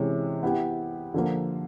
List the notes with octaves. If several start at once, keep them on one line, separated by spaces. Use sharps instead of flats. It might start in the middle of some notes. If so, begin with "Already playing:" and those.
Already playing: C3 E3 G#3 C#4
B3 E4 G4
D3 F3 A#3